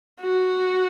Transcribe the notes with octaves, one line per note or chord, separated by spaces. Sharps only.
F#4